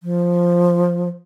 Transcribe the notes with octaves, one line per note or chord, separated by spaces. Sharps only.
F3